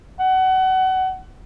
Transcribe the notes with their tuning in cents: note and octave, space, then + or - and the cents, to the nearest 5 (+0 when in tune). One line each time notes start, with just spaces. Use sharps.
F#5 +25